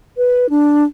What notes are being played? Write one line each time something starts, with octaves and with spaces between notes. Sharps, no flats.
B4
D4